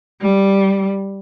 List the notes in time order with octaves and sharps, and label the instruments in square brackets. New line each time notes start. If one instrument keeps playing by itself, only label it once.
[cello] G3